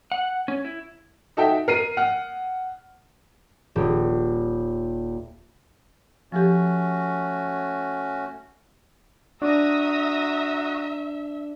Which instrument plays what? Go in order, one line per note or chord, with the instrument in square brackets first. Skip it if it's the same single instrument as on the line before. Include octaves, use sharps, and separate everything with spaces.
[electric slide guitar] F#5
C#4
E4
[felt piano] D#4 F#4 A4 E5 G5
A#4 C7 D#7
F#5 F6
[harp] D#1
[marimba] F3 G4 [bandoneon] A3 C#4 F#4
[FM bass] D4 [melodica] F#4 [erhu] E5 [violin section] A#5 D#6 A#6